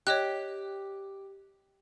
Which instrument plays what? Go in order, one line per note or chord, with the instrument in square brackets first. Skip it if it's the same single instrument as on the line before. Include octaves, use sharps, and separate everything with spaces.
[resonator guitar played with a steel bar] G4 [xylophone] C#5 D#5 F#6